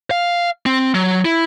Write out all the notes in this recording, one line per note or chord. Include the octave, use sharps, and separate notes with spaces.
F5
C4
F#3
E4